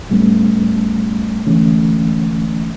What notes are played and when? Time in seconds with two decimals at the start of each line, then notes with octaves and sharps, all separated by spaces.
0.10 D#2 A2 G3 A3 B3 C#4
1.47 D3 E3 G#3 A3 C#4